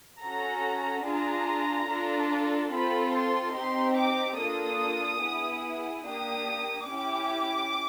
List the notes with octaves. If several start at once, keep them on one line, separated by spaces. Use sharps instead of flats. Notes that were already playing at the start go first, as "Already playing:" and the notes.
C#4 F#4 A4 A#5
D4 F4 G#4 A#5
D4 F4 A4
C4 F4 A4 B5
C6
C4 D#4 G4 C6
D6
A#3 D4 F4 A4 D#6
B3 E4 G#4
A#3 D4 G4 D#6
C#4 E4 G4 D6